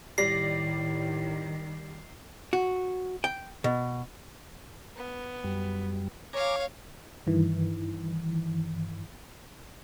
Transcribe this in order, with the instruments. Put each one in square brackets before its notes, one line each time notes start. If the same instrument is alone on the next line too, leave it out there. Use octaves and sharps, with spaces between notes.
[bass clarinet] A2 [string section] D#3 [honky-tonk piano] G3 D5 A#6 [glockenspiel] C7
[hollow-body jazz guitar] F#4
G5
B2
[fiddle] B3
[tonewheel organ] F#2 G3
[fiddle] C#5 F5 [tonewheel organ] G#5 A#5 D6
[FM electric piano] G2 D#3 E3